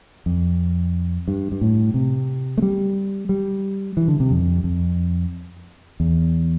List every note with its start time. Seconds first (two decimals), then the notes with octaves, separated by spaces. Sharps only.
0.26 F2
1.28 G2
1.52 G2
1.61 A2
1.94 C3
2.58 A3
2.62 G3
3.29 G3
3.97 E3
4.08 D3
4.20 C3
4.31 F2
4.64 F2
6.00 E2